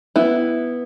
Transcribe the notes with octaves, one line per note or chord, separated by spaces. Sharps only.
B3 E4